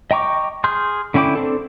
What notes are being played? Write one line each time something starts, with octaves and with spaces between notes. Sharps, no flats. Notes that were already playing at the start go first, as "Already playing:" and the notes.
D#5 G5 A#5 C#6 D6
G#4 C6 F6 G6
D3 C#4 E4 G5 D6
C4 D4 A4